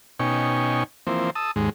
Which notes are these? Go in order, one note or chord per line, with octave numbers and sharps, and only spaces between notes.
B2 C#4 D#4 G5 G#5 C#6
E3 F3 A#3 C4 C5
A5 D#6 E6
D#2 G#2 G#3